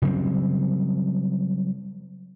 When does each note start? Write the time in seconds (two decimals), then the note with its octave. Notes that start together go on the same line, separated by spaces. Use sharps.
0.02 C#3 F#3 G3 C4